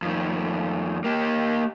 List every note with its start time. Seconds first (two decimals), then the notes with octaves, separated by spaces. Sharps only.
0.02 F2 D#3
1.04 A#3 G4